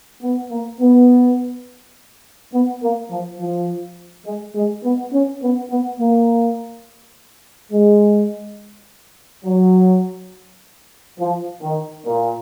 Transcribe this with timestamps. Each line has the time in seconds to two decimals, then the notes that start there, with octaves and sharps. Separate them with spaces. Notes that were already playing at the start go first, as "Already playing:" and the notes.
0.22 B3
0.50 A#3
0.80 B3
2.53 B3
2.82 A#3
3.11 F3
3.40 F3
4.26 G#3
4.55 G#3
4.84 B3
5.13 C#4
5.42 B3
5.71 B3
5.99 A#3
7.72 G#3
9.45 F#3
11.19 F3
11.62 D#3
12.06 A#2